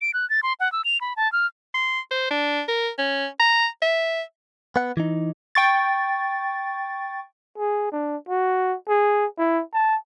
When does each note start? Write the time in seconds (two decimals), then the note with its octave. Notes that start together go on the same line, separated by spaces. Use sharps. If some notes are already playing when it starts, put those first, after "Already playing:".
0.01 D7
0.14 F#6
0.30 A6
0.43 C6
0.60 F#5
0.72 E6
0.85 F7
1.01 B5
1.16 A5
1.32 F6
1.74 C6
2.11 C5
2.31 D4
2.68 A#4
2.98 C#4
3.39 A#5
3.82 E5
4.76 B3 F#5
4.97 E3 D#4
5.55 G5 C#6 A6
7.58 G#4
7.92 D4
8.29 F#4
8.89 G#4
9.38 E4
9.74 A5